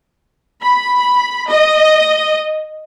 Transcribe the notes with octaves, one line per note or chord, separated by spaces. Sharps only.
B5
D#5